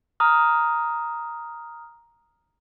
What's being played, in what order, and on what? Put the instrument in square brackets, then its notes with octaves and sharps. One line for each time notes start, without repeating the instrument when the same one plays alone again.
[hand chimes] A#5 D#6 F6